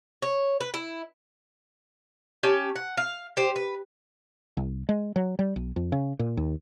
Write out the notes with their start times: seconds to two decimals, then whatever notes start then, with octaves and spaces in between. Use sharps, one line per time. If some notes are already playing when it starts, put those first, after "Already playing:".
0.22 C#5
0.61 B4
0.74 E4
2.43 C#4 G4 A5
2.76 F#5
2.97 F5
3.37 G4 C5
3.56 B4
4.57 C2
4.89 G#3
5.16 F#3
5.39 G3
5.56 B1
5.76 F2
5.92 C#3
6.19 A#2
6.37 D#2